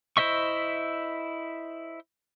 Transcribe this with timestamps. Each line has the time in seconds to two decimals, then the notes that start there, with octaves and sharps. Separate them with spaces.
0.17 E4 C5 D#5 E5 C#6